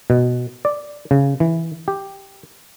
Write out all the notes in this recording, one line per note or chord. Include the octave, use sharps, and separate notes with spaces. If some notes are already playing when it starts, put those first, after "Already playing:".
B2
D5
C#3
E3
G4